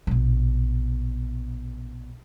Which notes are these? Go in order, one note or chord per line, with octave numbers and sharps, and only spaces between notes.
A#1 B2